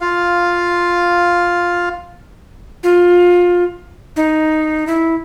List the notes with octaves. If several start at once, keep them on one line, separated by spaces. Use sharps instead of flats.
F4 F5
F4
D#4
E4